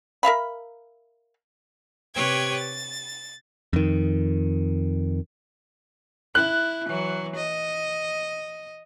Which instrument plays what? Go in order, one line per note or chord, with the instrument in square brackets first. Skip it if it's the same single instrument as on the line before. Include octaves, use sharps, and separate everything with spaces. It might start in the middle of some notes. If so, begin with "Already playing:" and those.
[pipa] A#4 E5 F5 B5
[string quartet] C3 G4 B4 C#5 G5 G#6
A6
[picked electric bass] F2 D#3
[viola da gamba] E4 [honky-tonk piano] F#6
[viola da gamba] E3 F#3
D#5